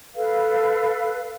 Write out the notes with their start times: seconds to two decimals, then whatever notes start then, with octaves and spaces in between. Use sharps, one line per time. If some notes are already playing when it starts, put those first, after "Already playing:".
0.15 A4 B4 F5